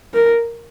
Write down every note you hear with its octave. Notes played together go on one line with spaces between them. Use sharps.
A#4